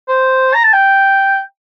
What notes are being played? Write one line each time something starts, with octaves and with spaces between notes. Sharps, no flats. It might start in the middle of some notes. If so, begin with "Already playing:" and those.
C5
A#5
A5
G5